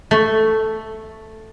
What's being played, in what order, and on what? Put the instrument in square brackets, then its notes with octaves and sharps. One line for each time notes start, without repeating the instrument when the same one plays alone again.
[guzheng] A3